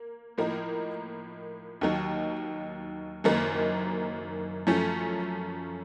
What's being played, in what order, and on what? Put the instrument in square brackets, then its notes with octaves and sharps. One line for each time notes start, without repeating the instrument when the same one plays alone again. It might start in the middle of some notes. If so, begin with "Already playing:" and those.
Already playing: [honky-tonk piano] A#3
A2 F3 A#3 D#4 A#4
D#2 D#3 F#3
F#1 F#2 D#3 A#3
F#2 F3 A3 C#4 A4